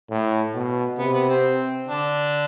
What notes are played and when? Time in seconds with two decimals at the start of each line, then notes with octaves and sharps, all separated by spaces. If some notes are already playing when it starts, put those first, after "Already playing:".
0.10 A2
0.55 B2
0.99 C3 B3
1.14 B3
1.29 C4
1.87 D3 D4